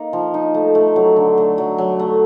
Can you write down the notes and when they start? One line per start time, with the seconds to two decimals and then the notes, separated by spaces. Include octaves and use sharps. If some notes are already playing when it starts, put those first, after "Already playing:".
Already playing: A#3 D#4
0.13 F3
0.34 D#4
0.54 A3
0.75 A3
0.96 F#3
1.17 D3
1.38 A3
1.58 F#3
1.78 F#3
1.99 A3